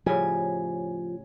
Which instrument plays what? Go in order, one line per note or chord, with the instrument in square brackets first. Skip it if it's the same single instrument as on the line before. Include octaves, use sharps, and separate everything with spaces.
[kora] A2 C#3 G3 [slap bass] F3 [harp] G#5